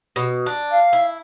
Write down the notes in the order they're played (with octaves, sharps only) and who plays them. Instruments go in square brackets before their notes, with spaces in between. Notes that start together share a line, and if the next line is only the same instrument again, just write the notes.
[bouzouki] B2
D4
[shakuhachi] F5
[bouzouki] E4